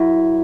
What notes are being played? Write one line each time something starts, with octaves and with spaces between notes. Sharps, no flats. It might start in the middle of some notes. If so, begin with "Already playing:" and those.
Already playing: F#2 E4